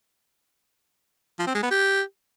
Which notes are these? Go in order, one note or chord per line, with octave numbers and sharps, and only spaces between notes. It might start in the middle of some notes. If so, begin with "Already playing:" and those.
F3
C4
G#3
B3
G4